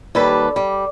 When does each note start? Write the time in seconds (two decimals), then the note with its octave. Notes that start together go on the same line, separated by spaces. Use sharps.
0.15 D#2 G3 A4 B4
0.56 G3